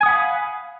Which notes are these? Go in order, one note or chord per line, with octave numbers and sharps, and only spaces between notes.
F5 F#5 G#5 B5 D#6